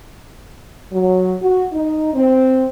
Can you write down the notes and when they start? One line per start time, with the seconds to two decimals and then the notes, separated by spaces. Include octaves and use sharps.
0.92 F#3
1.41 F#4
1.72 D#4
2.14 C4